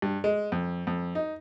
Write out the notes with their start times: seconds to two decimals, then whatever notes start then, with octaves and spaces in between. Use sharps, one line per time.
0.02 G2
0.24 G#3
0.52 F2
0.87 F2
1.15 D#4